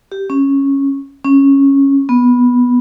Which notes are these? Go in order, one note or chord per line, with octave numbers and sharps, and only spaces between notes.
G4
C#4
C#4
B3